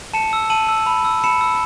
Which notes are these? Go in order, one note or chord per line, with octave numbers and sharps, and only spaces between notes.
A5 C#7 E7
E6
A5 D#7 F#7
E6
B5
E6
B5 C#7 E7
E6